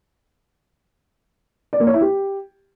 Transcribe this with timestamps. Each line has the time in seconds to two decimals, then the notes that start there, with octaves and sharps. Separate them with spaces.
1.73 D5
1.80 A#3
1.87 C#5
1.94 E4
2.01 G4